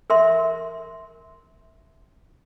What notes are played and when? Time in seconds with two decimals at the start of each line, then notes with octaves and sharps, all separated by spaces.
0.10 A#4 E5 C6